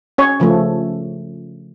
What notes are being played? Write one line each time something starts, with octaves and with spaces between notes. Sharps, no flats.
C#4 C#5
C#3 F3 A3